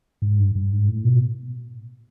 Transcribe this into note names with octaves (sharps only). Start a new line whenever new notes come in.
G#2
G2
G2
G#2
A2
B2